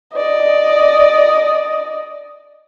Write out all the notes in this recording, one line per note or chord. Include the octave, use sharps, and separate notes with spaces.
D5 D#5